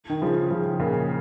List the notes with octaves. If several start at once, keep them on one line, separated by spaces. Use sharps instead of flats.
D#3
C#3 F3
C#3 F3
A#2 C#3